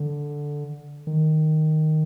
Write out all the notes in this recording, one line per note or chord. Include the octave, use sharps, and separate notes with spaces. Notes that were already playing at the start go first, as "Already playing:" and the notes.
Already playing: D3
D#3